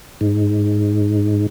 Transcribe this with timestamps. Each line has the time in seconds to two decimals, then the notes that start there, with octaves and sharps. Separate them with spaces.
0.21 G#2